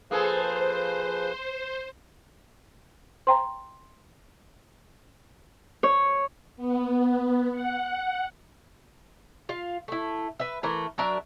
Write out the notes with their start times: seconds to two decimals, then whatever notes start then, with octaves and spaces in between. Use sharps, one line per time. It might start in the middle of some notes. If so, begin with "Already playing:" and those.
0.11 F3 A#3 G#4 A4 B4 C5
3.27 C5 G5 A#5 C6
5.83 C#5
6.57 B3
7.52 F#5
9.49 F4 F5
9.88 A3 E4
10.40 B4 E5
10.63 E3 A3 A#4
10.98 F#3 D4 A#4 E5